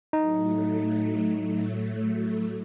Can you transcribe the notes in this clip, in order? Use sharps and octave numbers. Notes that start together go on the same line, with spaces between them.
A2 F#3 A3 D#4